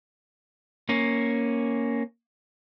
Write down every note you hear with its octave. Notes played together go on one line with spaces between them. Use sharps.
A#3 C#4